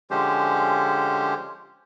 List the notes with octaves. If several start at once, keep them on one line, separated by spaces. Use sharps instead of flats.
D3 F3 G#3 C#4 G4 C5